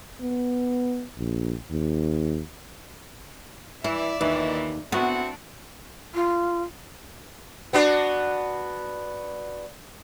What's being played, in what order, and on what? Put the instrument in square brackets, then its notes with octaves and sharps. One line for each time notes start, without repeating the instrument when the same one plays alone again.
[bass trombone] B3
A#1
D#2
[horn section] E3 [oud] E4 [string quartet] D5 E5
[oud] D#2 [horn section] A#2 D#3 E3
[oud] B3 [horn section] C4 E4 F#4 [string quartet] D4
[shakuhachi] F4
[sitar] B3 D4 F#4